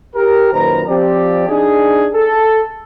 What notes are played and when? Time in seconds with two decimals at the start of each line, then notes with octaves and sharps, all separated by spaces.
0.15 G4 A#4
0.52 F#2 A#2 D#3 B4 C5 A#5
0.87 F3 C4 G4 D5
1.48 D4 D#4 G#4
2.13 A4